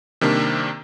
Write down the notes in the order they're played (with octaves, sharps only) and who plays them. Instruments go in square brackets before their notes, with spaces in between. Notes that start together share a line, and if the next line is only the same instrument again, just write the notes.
[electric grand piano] C3 D#3 G3 A#3 D4